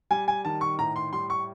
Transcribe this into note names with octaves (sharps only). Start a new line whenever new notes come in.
G3 G#5
G#5
D#3 A5
C#6
A2 A#5
C6
G3 C6
C#6